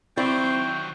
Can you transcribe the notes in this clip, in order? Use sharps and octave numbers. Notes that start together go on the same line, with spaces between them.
D#3 F#3 C4 E4 D5 G5